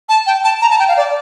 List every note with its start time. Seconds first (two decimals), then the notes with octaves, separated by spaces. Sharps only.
0.09 A5
0.27 G5
0.44 A5
0.62 A#5
0.70 A5
0.79 G5
0.88 F5
0.97 D5